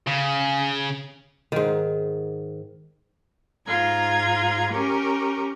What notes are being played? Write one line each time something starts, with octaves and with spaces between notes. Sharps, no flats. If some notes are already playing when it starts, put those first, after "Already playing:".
C#3
G#2 D#3
G#2 F4 A#5 G#6
C#4 G4 A#4